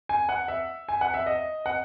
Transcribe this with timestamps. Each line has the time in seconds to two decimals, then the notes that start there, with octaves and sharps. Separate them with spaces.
0.09 G#5
0.29 F#5
0.48 E5
0.89 G#5
1.01 F#5
1.14 E5
1.26 D#5
1.66 F#5